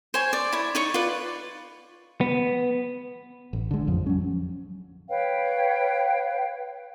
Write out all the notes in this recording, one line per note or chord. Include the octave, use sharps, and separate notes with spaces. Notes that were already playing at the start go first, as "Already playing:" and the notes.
C5 C#5 G#5
D5
E4 C#5
D#4 C#5 C#6
F4 B4 D5
B3
A1
D3 G#3
A1 F2 F3
F#3 C#4
B4 C#5 F5 G5